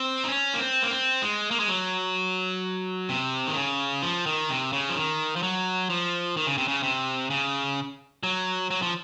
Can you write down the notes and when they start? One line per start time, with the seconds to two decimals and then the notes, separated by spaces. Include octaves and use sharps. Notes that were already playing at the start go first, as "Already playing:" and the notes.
Already playing: C4
0.24 D#4
0.28 C#4
0.54 A#3
0.59 C4
0.83 A#3
0.91 C4
1.22 G#3
1.51 A#3
1.59 G#3
1.69 F#3
3.09 C3
3.47 D#3
3.55 C#3
4.03 F3
4.26 D#3
4.49 C3
4.73 C#3
4.89 F3
4.96 D#3
5.36 F3
5.43 F#3
5.90 F3
6.37 D#3
6.47 C#3
6.58 C3
6.68 C#3
6.83 C3
7.30 C#3
8.23 F#3
8.71 F#3
8.82 F3